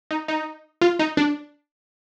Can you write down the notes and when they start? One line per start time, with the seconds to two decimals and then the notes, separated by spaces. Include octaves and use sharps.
0.11 D#4
0.28 D#4
0.81 F4
0.99 D#4
1.17 D4